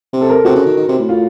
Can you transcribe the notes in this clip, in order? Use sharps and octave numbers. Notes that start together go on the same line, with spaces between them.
C3
A4
A#4
C3 F#4
C#3
D#3
D#3
C3
A2
F4